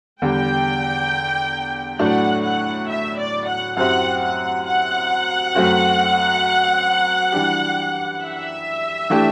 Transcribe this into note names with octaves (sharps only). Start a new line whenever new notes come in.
E2 D3 G3 G5
A2 F#3 A3 D4 F#5
F#5
E5
D5
F#5
F#2 F#3 C4 E4 G4 F#5
F#5
F#5
F#2 F#3 A3 C4 F#4
E3 G3 D4 G4
E5
E3 A3 D4 G4